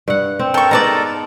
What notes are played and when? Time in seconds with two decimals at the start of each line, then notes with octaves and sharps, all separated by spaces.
0.08 G2 F#5
0.39 C4
0.54 A4 A#4 G5 C#6
0.71 G#3 B3 D#4 D5 A5 A#5